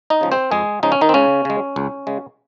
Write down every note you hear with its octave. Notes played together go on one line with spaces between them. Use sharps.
D#4 D#5
C#3 F3 G#3
C4 C5
F2 G#3 G#4
C#3 F3 G#3 D#4
C#4
D#3 D#4
C4
C#2 C#3 C#4
C#3 G#3
C#2
C#3 G#3